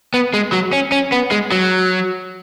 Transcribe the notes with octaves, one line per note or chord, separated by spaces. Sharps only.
B3
G#3
F#3
C#4
C#4
B3
G#3
F#3